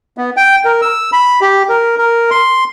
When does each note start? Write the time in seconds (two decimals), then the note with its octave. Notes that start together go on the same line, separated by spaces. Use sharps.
0.18 B3
0.37 G5
0.65 A#4
0.82 E6
1.13 B5
1.41 G4
1.69 A#4
1.98 A#4
2.31 C6